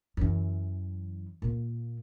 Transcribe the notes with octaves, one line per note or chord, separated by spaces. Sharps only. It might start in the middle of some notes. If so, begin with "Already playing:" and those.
F#2 E3
A#2 A#3